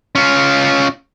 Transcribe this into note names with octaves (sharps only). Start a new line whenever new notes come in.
C#4 F4